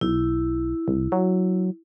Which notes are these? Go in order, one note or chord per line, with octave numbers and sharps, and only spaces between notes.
B1 E4
C2
F#3